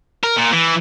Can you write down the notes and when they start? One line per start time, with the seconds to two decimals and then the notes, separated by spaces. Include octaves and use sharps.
0.23 A#4
0.37 A#2
0.53 E3